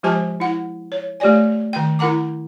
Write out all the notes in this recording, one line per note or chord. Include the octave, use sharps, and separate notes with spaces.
F3 G#3 G4 C5 G#5 A5
E4 F#5
C#5
A3 G4 C#5 D5 G#5
D#3 G5
E4 A#4 F#5 A#5 D6